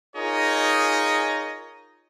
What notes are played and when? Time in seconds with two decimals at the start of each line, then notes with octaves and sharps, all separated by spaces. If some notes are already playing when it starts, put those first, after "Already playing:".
0.15 D#4 F4 G#4 A#4 C#5 D#5